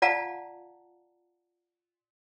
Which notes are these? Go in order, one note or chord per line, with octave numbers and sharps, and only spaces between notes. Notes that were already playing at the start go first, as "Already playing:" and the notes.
F4 D5 F5 F#5 A5 A#5